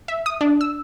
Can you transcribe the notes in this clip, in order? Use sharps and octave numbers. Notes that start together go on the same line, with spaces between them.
E5
D#6
D4
E6